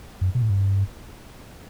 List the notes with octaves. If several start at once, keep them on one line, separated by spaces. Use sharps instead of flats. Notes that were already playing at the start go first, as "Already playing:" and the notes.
F#2
B2
A2
G2